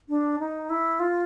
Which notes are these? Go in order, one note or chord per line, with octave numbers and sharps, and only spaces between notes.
D4
D#4
E4
F4